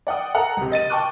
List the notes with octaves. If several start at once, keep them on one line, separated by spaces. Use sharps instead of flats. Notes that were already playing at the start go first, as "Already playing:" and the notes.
D5 F#5 G5 D#6
A4 F#5 A#5
C#2 C3
D#5 A6 D#7
G5 A5 C#6 D6 F#6